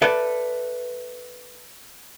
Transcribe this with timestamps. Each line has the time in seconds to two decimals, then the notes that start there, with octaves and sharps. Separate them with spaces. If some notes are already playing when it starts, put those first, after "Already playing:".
0.02 A4 B4 D5 E5